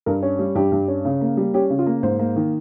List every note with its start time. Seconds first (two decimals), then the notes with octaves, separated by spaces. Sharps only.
0.06 G2 A#4
0.23 C#4
0.39 G3
0.55 G2 G4
0.72 G2
0.88 C#4
1.05 C#3
1.21 A#3
1.37 G3
1.54 C#4 G4
1.70 C#3
1.79 F4
1.86 A#3
2.03 G#2 C5
2.19 A#3
2.36 D#3